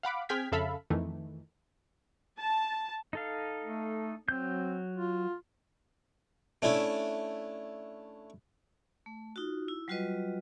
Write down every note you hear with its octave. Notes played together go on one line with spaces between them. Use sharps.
F5 F#5 B5 D6
C4 G#4 G5 F6 G#6 B6
F2 C#3 A4 E5 F5 B5
F2 D#3 E3 A3
A5
D#4 A4 F5
A3
F#3 C4 G6
F4
A3 C#4 D4 E4
A3
D#4 F4 F#4
E4
F#3 G3 F4 F#4 B4 D#5